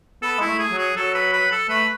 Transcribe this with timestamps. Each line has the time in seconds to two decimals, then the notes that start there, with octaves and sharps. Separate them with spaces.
0.22 B3 A4
0.38 G#3 E4
0.46 A3
0.59 G#4
0.72 F#3
0.78 G#4
0.96 F#3 A4
1.14 B4
1.33 B4
1.51 A4
1.69 A3 B4